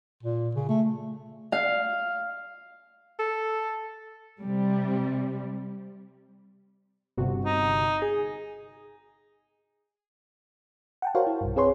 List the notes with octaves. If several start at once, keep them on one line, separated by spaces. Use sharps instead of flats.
A#2
C#3
A3
F5
A4
C3 G3
G1 C3 F#4
D#4
G#4
F#5 G5 A5
F#4 A#4 C5 C#5 F5 G5
E4
B1 G2
C4 G#4 B4 C#5 C6